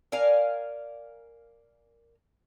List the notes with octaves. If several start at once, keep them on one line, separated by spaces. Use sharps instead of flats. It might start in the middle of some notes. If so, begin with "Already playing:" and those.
A#4 D5 F5 G#5